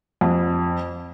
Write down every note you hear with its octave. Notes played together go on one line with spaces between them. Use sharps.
F2